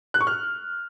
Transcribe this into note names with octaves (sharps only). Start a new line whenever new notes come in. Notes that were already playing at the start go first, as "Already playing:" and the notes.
F#6
C#6
F6